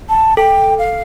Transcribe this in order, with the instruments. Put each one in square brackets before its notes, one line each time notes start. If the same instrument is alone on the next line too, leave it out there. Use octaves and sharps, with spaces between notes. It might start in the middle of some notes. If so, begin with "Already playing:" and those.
[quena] A5
[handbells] A4 [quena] G5
[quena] F5